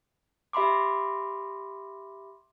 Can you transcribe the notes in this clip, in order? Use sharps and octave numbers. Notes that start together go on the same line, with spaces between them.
G4 E5 B5 C6 D6